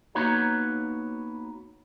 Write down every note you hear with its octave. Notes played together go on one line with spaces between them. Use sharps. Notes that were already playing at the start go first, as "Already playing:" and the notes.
A#3 B3 D#4 F#4 C#5 A#5